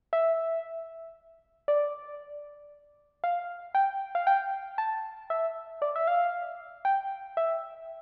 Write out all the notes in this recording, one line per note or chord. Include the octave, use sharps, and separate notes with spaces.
E5
D5
F5
G5
F5
G5
A5
E5
D5
E5
F5
G5
E5